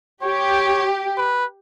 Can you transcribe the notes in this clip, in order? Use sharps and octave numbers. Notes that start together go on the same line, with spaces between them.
G4 C#5
B4